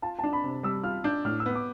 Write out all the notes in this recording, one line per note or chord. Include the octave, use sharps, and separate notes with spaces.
F4 A5
A5
D4
B5
C3
G3 E6
F4 F6
D4 G6
A2 F6
E6
B3
D6